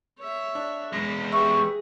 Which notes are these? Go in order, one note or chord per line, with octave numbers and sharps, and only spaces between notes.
C#5 E5
D4
E2 G#3 C#4 A#6
G4 G#4 B4 E5 C#6